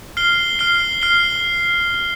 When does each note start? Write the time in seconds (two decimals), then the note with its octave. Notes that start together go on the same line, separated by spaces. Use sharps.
0.17 F6 C7 G7
0.59 F6 C7 G7
1.02 F6 C7 G7